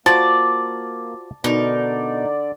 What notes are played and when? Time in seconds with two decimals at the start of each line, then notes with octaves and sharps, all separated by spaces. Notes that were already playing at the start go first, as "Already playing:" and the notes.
0.06 A#3 F4 F#4 C5 D5 A5 A6
1.44 B2 D3 D#4 A#4 D5